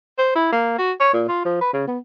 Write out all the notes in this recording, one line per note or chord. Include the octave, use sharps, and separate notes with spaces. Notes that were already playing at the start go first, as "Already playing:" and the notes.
C5
E4
A#3
F#4
C#5
A#2
F4
F3
B4
C#3
B3